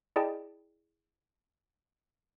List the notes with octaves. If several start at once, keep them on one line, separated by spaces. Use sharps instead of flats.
E4 G#4 D5 D#5 G5 A5